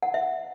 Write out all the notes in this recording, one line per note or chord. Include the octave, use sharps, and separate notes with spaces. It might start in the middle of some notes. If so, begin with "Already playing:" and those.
F#5
E5